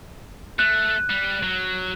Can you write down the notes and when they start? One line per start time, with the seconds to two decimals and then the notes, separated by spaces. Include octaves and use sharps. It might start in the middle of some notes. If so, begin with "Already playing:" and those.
0.59 A3 F#6
1.10 G3
1.43 F#3